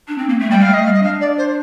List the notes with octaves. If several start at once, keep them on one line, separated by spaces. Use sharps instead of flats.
D4
C4
A#3
A3
G3 G5
G3 F5
A3
D#5
G3 F5
D#5
D4 F5
D5
C5